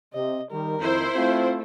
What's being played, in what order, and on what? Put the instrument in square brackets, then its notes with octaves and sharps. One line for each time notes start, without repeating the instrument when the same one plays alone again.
[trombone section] C3 [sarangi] D#5
[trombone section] D#3 G3 [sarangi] A#4
[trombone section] F2 D#3 [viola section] E4 C5
[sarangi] A3 [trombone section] C4 F4